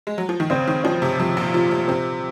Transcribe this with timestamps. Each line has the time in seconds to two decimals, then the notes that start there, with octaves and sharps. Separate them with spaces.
0.07 G#3
0.18 F#3
0.29 F3
0.40 D#3
0.50 C#3 C4
0.68 D#3
0.84 F3 C4
1.02 C3
1.20 C3 F3
1.37 A#2
1.54 C3 F4
1.71 C3
1.88 C3 C4